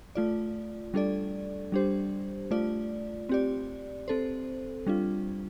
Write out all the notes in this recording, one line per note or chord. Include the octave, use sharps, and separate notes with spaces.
A3 F4 D5
G3 D4 A4 D5
G3 D4 G4 C5
A3 F4 D5
C4 G4 D5
C4 A4 C5
G3 D4 F4